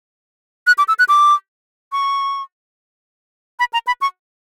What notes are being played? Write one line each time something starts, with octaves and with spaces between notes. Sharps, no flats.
F#6
D6
E6
F#6
D6
C#6
B5
A#5
B5
C#6